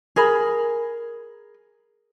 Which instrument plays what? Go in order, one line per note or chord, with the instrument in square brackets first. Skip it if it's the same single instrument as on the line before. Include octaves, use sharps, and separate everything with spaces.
[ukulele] G#4 A#4 B5